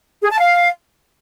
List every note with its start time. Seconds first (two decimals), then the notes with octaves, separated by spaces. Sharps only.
0.22 G#4
0.30 A5
0.39 F5